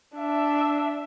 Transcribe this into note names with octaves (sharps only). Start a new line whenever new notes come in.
D4 E5